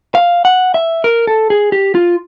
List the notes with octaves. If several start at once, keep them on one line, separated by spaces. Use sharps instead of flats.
F5
F#5
E5
A#4
A4
G#4
G4
F4